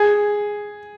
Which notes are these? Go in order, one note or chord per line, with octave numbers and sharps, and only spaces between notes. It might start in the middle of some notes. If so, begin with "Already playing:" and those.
Already playing: G#4